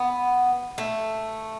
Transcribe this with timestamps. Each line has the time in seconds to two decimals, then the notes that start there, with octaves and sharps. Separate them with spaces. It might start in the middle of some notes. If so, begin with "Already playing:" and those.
Already playing: B3
0.78 A3